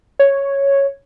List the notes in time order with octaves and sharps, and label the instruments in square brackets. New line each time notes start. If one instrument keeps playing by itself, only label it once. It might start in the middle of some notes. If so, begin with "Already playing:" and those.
[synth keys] C#5